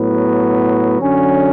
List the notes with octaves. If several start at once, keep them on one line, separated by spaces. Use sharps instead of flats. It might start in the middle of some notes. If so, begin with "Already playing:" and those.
Already playing: A2 F#3 B3
D3 F#3 C#4